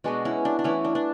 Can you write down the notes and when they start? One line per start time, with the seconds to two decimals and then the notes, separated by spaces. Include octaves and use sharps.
0.04 B2 G#3 B3 D4 F#4
0.25 C#4 E4
0.45 D4
0.59 D4
0.64 E3 A3 C#4 E4
0.85 D4
0.95 D4